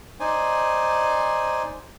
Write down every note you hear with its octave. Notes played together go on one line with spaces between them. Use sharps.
D#4 C5 D5 G#5